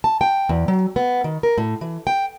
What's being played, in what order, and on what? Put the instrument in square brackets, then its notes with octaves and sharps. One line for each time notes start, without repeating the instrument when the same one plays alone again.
[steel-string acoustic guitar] A5
G5
E2
F#3
B3
D#3
A#4
A2
E3
G5